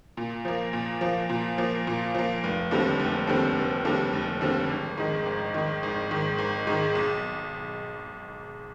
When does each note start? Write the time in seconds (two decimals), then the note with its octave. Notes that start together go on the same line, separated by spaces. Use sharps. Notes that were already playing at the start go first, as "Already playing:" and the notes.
0.17 A#2
0.45 F3 A#3
0.73 A#2
1.01 F3 A#3
1.29 A#2
1.58 F3 A#3
1.87 A#2
2.15 F3 A#3
2.44 F1
2.71 D#2 D3 G3 C4
2.99 F1
3.27 D#2 D3 G3 C4
3.56 F1
3.85 D#2 D3 G3 C4
4.13 F1
4.41 D#2 D3 G3 C4
4.69 G#1
4.98 G#2 D#3
5.26 G#1
5.54 G#2 D#3
5.83 G#1
6.11 G#2 D#3
6.38 G#1
6.67 G#2 D#3
6.95 B1